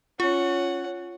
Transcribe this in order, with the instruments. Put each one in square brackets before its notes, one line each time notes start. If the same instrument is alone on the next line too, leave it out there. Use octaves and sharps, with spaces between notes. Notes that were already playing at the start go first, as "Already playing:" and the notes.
[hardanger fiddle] C#4 F#5 [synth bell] F4